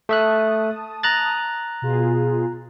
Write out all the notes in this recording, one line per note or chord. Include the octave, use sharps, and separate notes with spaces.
A3 E5 A5 D#6 F#6
A#5 F#6 A6
B2 F4 G#4